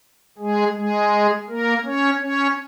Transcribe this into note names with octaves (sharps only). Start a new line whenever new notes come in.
G#3 G#4
G#3 G#4
A#3 A#4
C#4 C#5
C#4 C#5